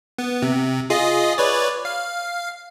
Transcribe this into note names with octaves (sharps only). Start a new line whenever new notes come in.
B3
C3
F4 G#4 D#5
B4 C#5 D5
F5